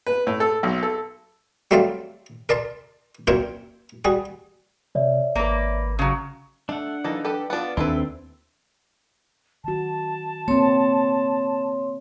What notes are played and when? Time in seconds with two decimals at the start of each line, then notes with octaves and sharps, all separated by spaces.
0.07 B4
0.27 A2
0.40 A4
0.63 B1
0.83 A4
1.71 F#3 G3 A3 C4 D5 F5
2.49 A#4 D5 A5 C6
3.27 F#2 A#2 C4 A#4 C#5 G5
4.05 G3 F#4 G#4
4.95 C3 C#5 D5 E5
5.35 G#1 A#3 B4
5.99 C#3 F#3
6.69 A3 D4 F#5
7.04 E3 A#3 D#4 A4
7.25 G4 A4 B4
7.50 B3 D4 F4 F#5
7.77 D#2 C4 D4 E4 A4 B4
9.64 D#3 F#4 A5
10.48 A#3 C4 C#5 C6